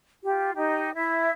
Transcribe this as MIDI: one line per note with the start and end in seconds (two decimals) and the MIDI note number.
0.24 0.51 65
0.24 0.51 67
0.56 0.91 63
0.56 0.91 67
0.94 1.33 64
0.94 1.33 76